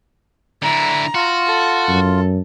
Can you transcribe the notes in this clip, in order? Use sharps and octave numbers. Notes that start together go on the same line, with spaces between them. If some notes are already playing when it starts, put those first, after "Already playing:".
D3 E4 A#5
F4 F#4
A4
F#2